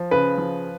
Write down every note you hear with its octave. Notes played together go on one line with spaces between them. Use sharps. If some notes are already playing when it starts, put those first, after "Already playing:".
Already playing: F3
C#3 B4
F3